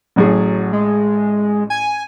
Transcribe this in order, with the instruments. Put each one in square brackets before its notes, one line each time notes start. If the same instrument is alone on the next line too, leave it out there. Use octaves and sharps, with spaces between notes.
[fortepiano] A1 A2 G#4 [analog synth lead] F#3
[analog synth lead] G#3
G#5